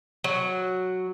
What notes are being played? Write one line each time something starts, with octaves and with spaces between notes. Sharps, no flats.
F#3